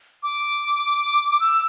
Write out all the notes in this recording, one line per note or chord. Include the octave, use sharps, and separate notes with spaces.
D6
E6